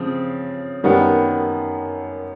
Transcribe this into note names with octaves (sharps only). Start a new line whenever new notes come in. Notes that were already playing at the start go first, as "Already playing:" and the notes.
Already playing: C#3 F3 C4
F#2 D#3 G3 B3